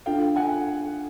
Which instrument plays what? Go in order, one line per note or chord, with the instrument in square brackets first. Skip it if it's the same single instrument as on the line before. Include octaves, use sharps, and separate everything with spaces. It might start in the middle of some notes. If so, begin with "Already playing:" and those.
[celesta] D4 F4 A4 [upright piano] F5 G5
[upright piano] F#5 G#5